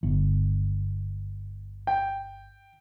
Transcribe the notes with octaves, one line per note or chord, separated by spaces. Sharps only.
G1
G5